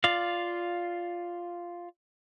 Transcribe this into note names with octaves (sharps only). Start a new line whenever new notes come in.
F4 D5 F5